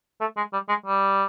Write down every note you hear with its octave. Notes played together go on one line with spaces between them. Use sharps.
A3
G#3
G3
G#3
G3